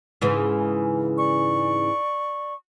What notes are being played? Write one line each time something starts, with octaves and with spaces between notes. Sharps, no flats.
G#2 C#3 E3
D5 C#6